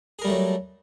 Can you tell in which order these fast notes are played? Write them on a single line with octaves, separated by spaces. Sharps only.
G#4 A#4 G3 A3 F#3